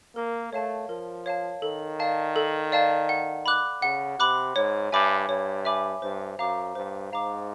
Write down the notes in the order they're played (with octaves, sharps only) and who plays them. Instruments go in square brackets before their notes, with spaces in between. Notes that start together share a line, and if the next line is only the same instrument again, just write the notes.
[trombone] A#3 [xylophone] A#4
[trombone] A3 [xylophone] C#5 F5 A5
[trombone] F3 [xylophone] A#4
[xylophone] C#5 F5 A5
[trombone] D#3 [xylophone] A4
[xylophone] D5 F5 A5
A4
D5 F5 A5
F#5
B5 D6 F#6
[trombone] C#3 [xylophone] F#5
[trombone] C3 [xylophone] B5 D6 F#6
[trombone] G#2 [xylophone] C#5
[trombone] G2 [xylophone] E5 G#5 B5 D6
[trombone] G2 [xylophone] C#5
[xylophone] E5 G#5 B5 D6
[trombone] G2 [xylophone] C5
[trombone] F#2 [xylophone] F5 A#5 D6
[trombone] G2 [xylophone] C5
[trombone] G#2 [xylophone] F5 A#5 D6